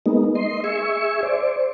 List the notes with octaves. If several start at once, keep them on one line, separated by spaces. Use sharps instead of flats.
G#3 A#3 B3 D#4
D#5 C6
G#4 E5 C#6
C5 D5